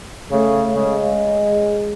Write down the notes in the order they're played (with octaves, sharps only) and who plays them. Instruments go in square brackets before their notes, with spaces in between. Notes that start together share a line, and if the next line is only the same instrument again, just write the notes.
[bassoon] C#3 [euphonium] A3
[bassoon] C#3 [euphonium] G#3